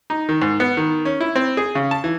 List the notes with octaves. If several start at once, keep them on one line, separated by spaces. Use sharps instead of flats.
D#4
D#3
G#2
B3
D#3
C#4
E4
C4
G#4
C#3
A5
E3